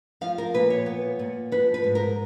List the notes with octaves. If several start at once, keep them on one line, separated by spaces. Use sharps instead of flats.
F3 F5
A#4
A#2 B4
C#5
B3
A#2
F3 B4
B4
G#2
A#4